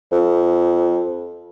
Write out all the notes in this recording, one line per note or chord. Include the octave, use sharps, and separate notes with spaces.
F2